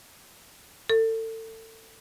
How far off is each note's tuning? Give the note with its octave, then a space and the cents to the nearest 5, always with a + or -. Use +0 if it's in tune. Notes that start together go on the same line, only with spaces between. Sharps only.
A4 +30